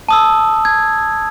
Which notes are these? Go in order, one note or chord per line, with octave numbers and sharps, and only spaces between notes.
A5 D#6 E6
G#6